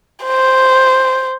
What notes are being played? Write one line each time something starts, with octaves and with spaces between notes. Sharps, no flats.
C5